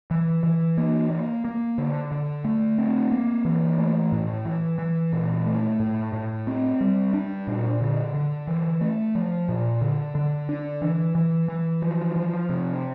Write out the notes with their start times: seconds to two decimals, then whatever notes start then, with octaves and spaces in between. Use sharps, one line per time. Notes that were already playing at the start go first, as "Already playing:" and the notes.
0.11 E3
0.43 E3
0.78 A#3
1.10 A#3
1.45 A#3
1.78 D3
2.11 D3
2.45 A3
2.78 C4
3.12 A#3
3.45 E3
3.78 A3
4.12 A2
4.45 E3
4.79 E3
5.13 A#2
5.46 A3
5.80 A2
6.13 A2
6.47 C4
6.81 G3
7.14 D4
7.47 A#2
7.81 D3
8.14 D3
8.47 E3
8.81 A3
9.15 F3
9.49 A#2
9.82 D3
10.15 D3
10.49 D4
10.82 E3
11.15 E3
11.49 E3
11.82 F3
12.16 F3
12.49 C3